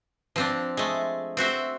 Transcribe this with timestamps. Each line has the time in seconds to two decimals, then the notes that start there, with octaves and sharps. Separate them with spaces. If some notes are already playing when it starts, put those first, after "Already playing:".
0.36 F3 C4 D4
0.77 G#3 A3
1.37 C4 F#4 C5 E5